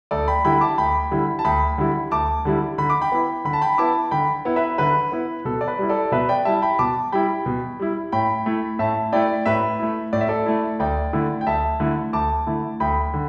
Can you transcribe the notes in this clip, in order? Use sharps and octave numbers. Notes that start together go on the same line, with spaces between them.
D2 A4 D5
G5 B5
D3 G3 E4 G5 B5
A5 D6
D2 G5 B5
D3 G3 E4
A5
D2 G5 B5
D3 G3 E4
D2 A5 D6
D3 G3 E4
D3 B5
D6
G5 B5
B3 E4
D3 B5
A5
G5 B5
B3 E4 A5 D6
D3 G5 B5
B3 E4
B4 E5
D3 B4
B3 E4
B2 A4
D5
B4
G3 E4
A4 D5
B2 B4 E5
D5 G5
G3 E4 E5 A5
G5 B5
B2 A5 D6
G3 E4 G5 B5
B2
G3 E4
A2 G5 B5
A3 E4
A2 E5 A5
A3 E4 D5 G5
A2 B4 E5
A3 E4
A2 D5
E5
A4 D5
A3 E4
D2 D5 G5
D3 A3 E4
G5
D2 E5 A5
D3 A3 E4
D2 A5 D6
D3 A3 E4
D2 G5 B5
D3